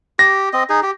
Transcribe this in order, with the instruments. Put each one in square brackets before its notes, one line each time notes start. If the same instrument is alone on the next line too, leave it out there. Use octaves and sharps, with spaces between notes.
[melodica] G4 [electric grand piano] A#6
[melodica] C4 D#5
D#4 G#4
G4